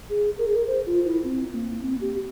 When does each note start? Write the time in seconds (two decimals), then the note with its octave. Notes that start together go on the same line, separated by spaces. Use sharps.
0.10 G#4
0.38 A#4
0.48 G#4
0.56 A#4
0.67 C5
0.86 F4
1.05 E4
1.24 C4
1.53 A#3
1.82 C4
2.01 G4